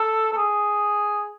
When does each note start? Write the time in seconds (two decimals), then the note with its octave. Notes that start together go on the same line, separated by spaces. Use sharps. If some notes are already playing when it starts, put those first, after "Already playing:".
Already playing: A4
0.33 A4
0.38 G#4